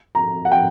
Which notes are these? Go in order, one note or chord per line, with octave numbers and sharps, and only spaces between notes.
A#5
F#5
G5